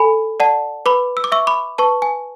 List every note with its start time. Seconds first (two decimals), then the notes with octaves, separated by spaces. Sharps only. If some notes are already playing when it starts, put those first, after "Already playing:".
Already playing: A4 G#5 B5
0.40 D5 F#5 A5
0.86 B4 B5 D6
1.17 E6
1.24 D6
1.32 E5 C#6 E6
1.47 B5 D6
1.78 B4 A5 C#6
2.02 G#5